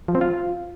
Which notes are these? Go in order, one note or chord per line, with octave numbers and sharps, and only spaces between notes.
F3
C4
F4